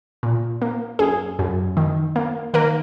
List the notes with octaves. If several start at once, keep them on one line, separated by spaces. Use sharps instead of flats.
A#2
A#3
F#2 G#4
F#2
D#3
A#3
D#3 A#3 A#4